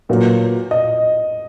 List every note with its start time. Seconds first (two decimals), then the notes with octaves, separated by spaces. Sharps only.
0.09 A#2 F#3 B3 F#4 A#4
0.71 D#5